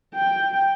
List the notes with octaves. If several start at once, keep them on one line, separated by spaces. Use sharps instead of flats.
G5